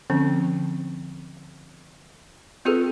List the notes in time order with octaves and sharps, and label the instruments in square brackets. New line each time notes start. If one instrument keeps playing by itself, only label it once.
[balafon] D3 F3 C4 C#4
C4 F4 G#4 A4 B4